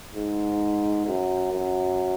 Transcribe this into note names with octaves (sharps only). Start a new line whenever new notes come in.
G#2
F#2
F#2